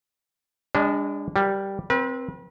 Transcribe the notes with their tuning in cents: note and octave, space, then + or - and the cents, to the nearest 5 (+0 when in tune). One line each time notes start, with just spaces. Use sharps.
G#3 -45 D4 -15 D#5 +15
G3 +0 A#4 +25
C4 +0 B4 -40